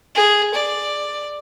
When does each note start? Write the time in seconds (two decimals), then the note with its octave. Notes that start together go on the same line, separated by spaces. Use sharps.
0.15 G#4
0.54 D5